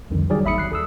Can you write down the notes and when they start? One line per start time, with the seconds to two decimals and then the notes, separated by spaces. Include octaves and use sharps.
0.10 C2 F2 D3 D#3
0.30 D#3 F#3 G3 G#4 A#4 D5
0.44 G#1 D#2 E5 B5 D#6 C#7
0.58 F#6 C7
0.71 A4 D#6 E6